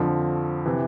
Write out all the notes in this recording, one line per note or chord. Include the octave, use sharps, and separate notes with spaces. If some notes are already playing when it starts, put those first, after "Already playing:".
Already playing: F2 D3 F3
C3 E3